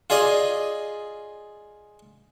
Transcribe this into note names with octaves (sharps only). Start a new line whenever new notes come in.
F4 G#4 D5 D#5